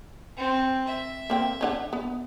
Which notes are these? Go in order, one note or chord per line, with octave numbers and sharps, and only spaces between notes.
C4
E5
A#3 C4 G5
C#4 D4 F#5
B3